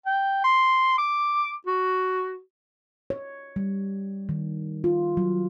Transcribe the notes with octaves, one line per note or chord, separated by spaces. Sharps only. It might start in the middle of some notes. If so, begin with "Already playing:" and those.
G5
C6
D6
F#4
C#5
G3
D#3
F4
F#3